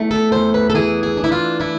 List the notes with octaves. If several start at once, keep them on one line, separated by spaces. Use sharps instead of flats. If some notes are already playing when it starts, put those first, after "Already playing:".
Already playing: E2 A3
A4
E2 C5
B4
A4
E3 G#4
G#4
D4
E4
F4
A3 E4